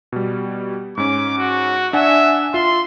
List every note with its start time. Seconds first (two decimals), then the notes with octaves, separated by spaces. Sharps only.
0.12 B2 G3
0.97 G#2 C#4 D6
1.38 F#4
1.93 D4 E5 F#5 G#5
2.54 F4 E5 C6